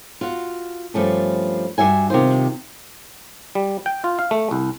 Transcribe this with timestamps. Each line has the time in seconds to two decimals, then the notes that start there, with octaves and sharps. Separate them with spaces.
0.21 F4 F#4
0.94 G2 F3 A3 C#4
1.78 G2 F#4 E5 G#5
2.10 C3 D#3 F4 C5
3.55 G3
3.86 G5
4.04 F4
4.19 F5
4.31 A3
4.51 C2